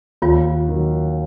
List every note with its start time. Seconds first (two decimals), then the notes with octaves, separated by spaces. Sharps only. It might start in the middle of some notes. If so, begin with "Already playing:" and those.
0.22 D#2 F4
0.68 D#3 F#3